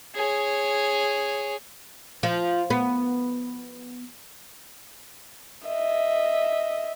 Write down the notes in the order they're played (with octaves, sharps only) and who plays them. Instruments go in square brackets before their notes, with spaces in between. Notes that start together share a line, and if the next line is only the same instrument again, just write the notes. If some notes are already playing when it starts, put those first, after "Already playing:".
[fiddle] G#4 C#5
[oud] F3
B3
[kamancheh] D#5 E5